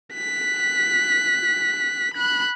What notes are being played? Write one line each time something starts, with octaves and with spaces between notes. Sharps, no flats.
F#6 B6
B5 F#6